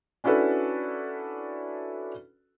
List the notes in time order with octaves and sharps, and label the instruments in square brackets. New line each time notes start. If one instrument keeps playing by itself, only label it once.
[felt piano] C#4 D4 E4 F#4 A4 B4